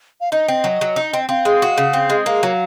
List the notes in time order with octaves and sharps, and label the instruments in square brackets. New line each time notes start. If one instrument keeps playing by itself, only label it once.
[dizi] F5
[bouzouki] D#4 [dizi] D#5
[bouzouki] C4
F#3
F#3
D#4
C4
[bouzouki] C4 [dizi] F5
[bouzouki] G#3
F#4
C#3
C4
G#3
[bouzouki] A#3 [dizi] F5
[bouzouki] F#3